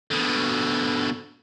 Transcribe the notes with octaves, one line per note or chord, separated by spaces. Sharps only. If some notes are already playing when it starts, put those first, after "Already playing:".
B2 D3